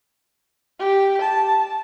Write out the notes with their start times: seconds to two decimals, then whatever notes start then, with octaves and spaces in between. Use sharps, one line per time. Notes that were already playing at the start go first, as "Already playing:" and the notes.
0.79 G4
1.22 A5